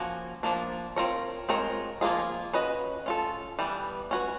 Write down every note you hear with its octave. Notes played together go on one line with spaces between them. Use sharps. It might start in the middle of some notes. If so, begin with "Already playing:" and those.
Already playing: F3 A#3 C#4 F#4
F3 A#3 D4
C4 F4 A#4 C#5
G#3 C4 F4 A#4 C#5
F3 A#3 C#4 F4 G#4
C#4 F#4 B4 D#5
C#4 F4 A4
E3 G3 B3
C#4 F#4 B4